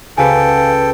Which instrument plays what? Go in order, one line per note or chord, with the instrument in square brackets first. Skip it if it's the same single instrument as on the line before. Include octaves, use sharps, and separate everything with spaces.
[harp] C#2 F#4 B4 [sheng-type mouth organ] A4 G5 [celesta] F5 G#5